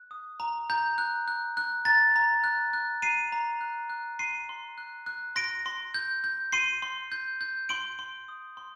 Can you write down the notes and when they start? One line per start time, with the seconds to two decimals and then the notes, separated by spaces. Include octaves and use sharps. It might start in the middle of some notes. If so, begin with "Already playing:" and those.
Already playing: F#6
0.11 D#6
0.40 A#5
0.70 A#5 G6
0.98 F#6
1.28 F#6
1.57 F#6
1.85 A#5 A6
2.16 A#5
2.44 F#6
2.73 F#6
3.02 A#5 C7 D#7
3.32 A#5
3.61 F#6
3.90 F#6
4.19 C6 C7 D#7
4.49 C6
4.78 F#6
5.06 F#6
5.36 C6 A#6 D7
5.66 C6
5.94 G6
6.24 G6
6.52 C6 C7 D#7
6.82 C6
7.12 G6
7.41 G6
7.69 C6 D7 F#7
7.99 C6
8.28 D#6
8.57 C6